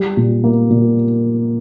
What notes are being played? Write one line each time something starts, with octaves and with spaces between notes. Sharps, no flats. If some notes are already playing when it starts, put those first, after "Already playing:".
Already playing: G3
A#2
A#3
A#2